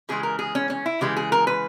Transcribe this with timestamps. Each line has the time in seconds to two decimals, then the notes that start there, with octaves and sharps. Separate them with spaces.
0.09 C#3 E3 G#3 G#4
0.23 A#4
0.39 G#4
0.55 C#4
0.70 C#4
0.86 E4
1.01 C#3 E3 G#3 G4
1.17 G#4
1.32 A#4
1.47 B4